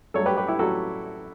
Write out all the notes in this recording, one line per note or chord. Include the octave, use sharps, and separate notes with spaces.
G2 F#3 A3 A4 C#5
G4 B4
G4 B4
E4 G4
F#3 A3 F#4 A4